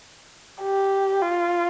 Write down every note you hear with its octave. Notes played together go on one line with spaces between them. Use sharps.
G4
F4